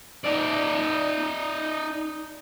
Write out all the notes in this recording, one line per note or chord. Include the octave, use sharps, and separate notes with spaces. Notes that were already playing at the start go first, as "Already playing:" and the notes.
D#4 D5